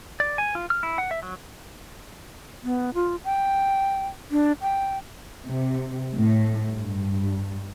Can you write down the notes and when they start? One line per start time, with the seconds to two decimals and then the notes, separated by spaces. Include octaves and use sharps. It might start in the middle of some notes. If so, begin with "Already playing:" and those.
0.20 D5
0.38 G#5
0.55 F4
0.70 F6
0.83 E4
0.98 F#5
1.11 E5
1.23 F#3
2.64 B3
2.94 F4
3.24 G5
4.31 D4
4.62 G5
5.47 C3
6.15 A2
6.71 G2